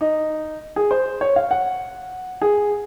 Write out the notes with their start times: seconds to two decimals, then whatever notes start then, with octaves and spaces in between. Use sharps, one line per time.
0.01 D#4
0.76 G#4
0.91 C5
1.21 C#5
1.36 F5
1.51 F#5
2.42 G#4